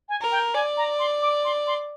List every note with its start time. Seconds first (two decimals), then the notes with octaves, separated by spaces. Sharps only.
0.09 G#5
0.21 A#4
0.31 G5
0.54 D5 G#5
0.77 A#5
0.99 C6
1.22 D6
1.44 C6
1.67 C6